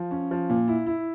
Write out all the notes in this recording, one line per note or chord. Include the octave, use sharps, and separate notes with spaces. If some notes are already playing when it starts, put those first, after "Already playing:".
Already playing: F3
C#4
F3
A#2
E4
E4